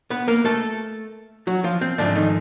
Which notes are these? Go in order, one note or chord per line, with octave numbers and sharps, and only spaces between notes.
B3 B4
A#3 A#4
A3 A4
F#3 F#4
F3 F4
C4
G#2 D3 F3 A3 D4
D#3 D#4